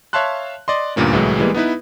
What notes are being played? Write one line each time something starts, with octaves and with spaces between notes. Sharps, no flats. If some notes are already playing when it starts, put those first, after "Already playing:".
C#5 E5 F5 A5 C6 F#6
D5 D#5 C6
D2 G2 A#2 A#3 C#4
C2 A2 E3 F#3 G#3
E3 G3 G#3 A#3 B3
B3 D#4 E4 B4